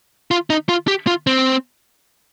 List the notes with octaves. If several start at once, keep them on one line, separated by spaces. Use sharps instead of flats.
F4
D#4
F4
G4
F4
C4